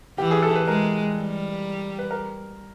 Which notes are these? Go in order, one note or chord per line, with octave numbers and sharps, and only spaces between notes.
E3 G4
G#4
A4
B4
G#3 A#4
G3
B4
A#4